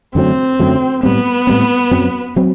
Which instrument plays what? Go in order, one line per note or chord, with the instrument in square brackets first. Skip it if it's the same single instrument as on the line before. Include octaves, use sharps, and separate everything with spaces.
[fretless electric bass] F#2 D3 F#3 A3 [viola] C4
[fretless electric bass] F#2 D3 F#3 A3
[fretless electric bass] A2 G3 C4 [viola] B3
[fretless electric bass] A2 G3 C4
F#2 F#3 C4
F#3 C4